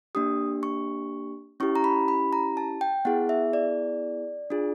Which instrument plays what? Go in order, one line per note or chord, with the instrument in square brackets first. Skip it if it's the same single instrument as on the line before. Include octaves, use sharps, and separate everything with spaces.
[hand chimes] A#3 D4 G4 D#6
C#6
C#4 E4 G4 C#6
A#5
B5
B5
A#5
A5
G5
B3 E4 G#4 F#5
E5
D5
D4 F4 G#4